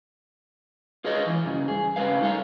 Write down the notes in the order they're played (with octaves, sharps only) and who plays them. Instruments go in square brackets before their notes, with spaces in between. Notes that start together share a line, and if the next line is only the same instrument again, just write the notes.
[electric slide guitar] F4 G#4 B4 C#5 D#5
E3
G2 C#3
G#4
G2 C#3 G3 B4 F5
D#4 A4 F5